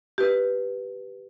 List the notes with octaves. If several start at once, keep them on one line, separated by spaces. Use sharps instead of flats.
G4 B4